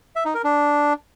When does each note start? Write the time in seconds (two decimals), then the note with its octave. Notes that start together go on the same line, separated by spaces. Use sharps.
0.16 E5
0.25 D#4
0.35 A#4
0.44 D4